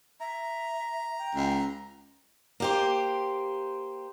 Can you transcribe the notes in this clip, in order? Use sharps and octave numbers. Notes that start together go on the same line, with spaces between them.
E5 A#5
G5
C#2
A#3 G4 C5